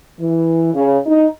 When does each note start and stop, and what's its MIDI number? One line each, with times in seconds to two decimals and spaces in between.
0.19 0.72 52
0.74 0.98 49
1.06 1.26 63